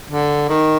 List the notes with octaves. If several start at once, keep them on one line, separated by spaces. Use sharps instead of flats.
D3
D#3